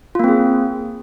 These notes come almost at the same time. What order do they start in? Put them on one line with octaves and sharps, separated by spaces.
F4 A#3 C4 G#4